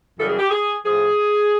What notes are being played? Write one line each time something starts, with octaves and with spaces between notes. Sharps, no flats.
F#2 C#3 E3 G3 A4
G#4
G4
G#4
A2 F3 G#4